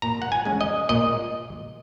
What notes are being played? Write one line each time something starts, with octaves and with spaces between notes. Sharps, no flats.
A#2 A#5
F#5
G#5
G#3 C#4
D#5
A#2 D#5